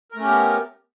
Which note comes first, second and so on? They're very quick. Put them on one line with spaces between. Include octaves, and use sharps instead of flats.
A#4 A3 C#4 G4 B3